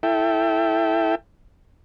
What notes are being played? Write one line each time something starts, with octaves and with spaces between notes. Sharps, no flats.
E4 A4 E5 G5